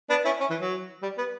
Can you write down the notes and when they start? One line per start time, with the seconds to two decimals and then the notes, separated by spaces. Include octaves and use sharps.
0.10 B3 D4
0.25 C#4 E4
0.40 C#4
0.50 E3
0.61 F#3
1.03 G3
1.18 B3